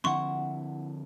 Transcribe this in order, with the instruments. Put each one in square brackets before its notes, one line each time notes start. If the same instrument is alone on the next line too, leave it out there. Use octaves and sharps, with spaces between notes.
[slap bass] D3 F3 C4 [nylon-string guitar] E4 F#5 [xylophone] C6 C#6